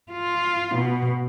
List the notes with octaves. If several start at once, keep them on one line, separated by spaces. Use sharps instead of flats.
F4
B2